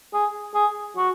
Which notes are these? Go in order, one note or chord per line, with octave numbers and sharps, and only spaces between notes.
G#4
G#4
F#4